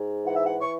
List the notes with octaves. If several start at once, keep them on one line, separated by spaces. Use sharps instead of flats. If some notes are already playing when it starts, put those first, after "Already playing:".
Already playing: G#2
E3 F#5
E5
F#5
C#6